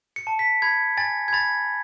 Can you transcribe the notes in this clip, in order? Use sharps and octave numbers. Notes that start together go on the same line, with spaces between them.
C#7
A5
B6
B5 G#6
G#5 A6
G#6
B5 A6